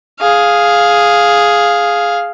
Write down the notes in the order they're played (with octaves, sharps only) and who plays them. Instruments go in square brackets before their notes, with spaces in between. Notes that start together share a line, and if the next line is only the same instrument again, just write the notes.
[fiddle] G#4 F5